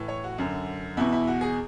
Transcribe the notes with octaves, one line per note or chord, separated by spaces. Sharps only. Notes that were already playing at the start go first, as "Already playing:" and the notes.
Already playing: A2 E3
C#5
F#4
F#2 D3
E2 B2 E4
E4
F#4
G#4